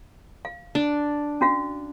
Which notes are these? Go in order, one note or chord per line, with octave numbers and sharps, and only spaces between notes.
F5
D4
C#4 F#4 F5